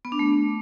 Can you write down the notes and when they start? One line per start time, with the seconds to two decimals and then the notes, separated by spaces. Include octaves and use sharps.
0.05 B3
0.12 D4
0.19 A3